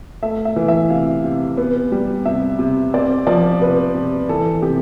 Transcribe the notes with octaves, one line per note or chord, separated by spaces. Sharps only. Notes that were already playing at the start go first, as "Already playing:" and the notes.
A3 E5
E5
E3
E5
C3 F5
C3
B3
G3
C3 E5
C3
C4 D5
F3 D5
C3 B4
C3
E3 A4
C3 G4